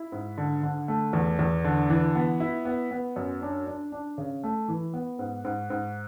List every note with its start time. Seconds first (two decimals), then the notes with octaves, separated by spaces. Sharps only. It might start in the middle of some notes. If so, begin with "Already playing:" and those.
Already playing: E4
0.12 G#2
0.38 D3
0.63 D3
0.88 A3
1.13 E2
1.39 E2
1.64 D3
1.90 E3
2.15 B3
2.40 E4
2.65 B3
2.91 B3
3.16 F#2
3.42 D4
3.67 D4
3.92 D4
4.18 C#3
4.43 A3
4.68 E3
4.94 B3
5.19 G#2
5.45 G#2
5.70 G#2